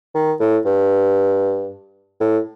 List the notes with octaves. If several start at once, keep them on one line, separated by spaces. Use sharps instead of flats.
D#3
A2
G2
A2